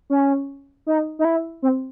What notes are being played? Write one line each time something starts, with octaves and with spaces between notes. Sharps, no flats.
C#4
D#4
D#4
E4
C4